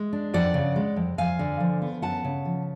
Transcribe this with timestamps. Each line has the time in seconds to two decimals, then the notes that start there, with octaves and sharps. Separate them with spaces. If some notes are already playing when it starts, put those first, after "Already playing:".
Already playing: G#3
0.13 D4
0.34 F2 D5 F#5
0.54 C#3
0.76 G#3
0.96 F2
1.18 F2 F5 G#5
1.39 D3
1.60 F3
1.82 B3
2.02 F#2 F#5 A5
2.25 C#3
2.45 F3